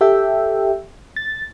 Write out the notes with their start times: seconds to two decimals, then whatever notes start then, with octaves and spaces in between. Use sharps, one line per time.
0.01 G4 A4 E5 G5
1.16 A6